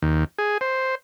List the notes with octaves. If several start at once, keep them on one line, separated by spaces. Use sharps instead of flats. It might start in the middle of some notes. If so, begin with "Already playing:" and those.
D#2
G#4
C5